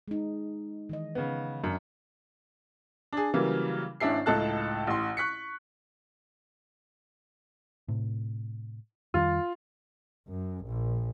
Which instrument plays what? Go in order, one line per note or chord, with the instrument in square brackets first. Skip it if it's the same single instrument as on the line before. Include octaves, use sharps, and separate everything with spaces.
[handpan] G#3 D#4
D#3 E3 D#5
[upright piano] C#3 B3
[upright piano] F#2 [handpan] D4
[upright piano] D4 G#4
C#3 E3 F#3 G3 A#3
G#1 C#4 D4 E4 C7
C#2 A2 D#4 A4 A5 F#6
A1 C6
C#6 F#6 B6 C#7
[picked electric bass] A2 C3
[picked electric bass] F2 D#3 G3 [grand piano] F4
[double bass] F#2
A#1